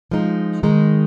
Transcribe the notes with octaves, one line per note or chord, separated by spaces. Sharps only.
F3 G#3 D#4
D#3 G#3 D#4